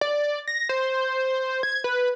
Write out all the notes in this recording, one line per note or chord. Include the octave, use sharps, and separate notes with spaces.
D5
A#6
C5
G#6
B4